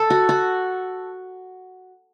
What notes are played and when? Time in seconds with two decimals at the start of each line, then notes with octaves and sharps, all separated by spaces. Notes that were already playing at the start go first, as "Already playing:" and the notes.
Already playing: A4
0.10 F#4
0.29 F#4